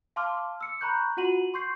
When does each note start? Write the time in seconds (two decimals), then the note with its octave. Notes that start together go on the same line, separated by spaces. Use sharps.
0.16 F5 A5 C6 D6 F6
0.61 E6 C#7
0.81 A#5 B5 C#6 F#6 G6
1.17 F4 F#4 F#5 D#7 F#7
1.54 C6 C#6 G6 C7